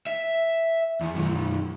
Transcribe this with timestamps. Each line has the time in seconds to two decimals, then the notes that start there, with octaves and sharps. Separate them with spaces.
0.07 E5
1.01 E2
1.15 B1 F#2